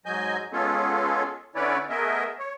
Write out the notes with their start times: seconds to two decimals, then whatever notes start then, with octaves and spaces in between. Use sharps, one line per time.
0.06 G#2 F#3 D#5 G#5 G6
0.53 G#3 B3 C#4 F4 G#4 A4
1.55 D3 C#4 E4 B4 C#5 D5
1.90 A3 B3 G#4 A#4 D#5 E5
2.39 C#5